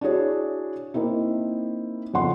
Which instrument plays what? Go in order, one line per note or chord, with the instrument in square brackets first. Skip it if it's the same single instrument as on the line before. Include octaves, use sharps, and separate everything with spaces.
[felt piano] D4 E4 F#4 G#4 C#5
A#3 C4 D#4 E4
F2 C#3 F#5 C6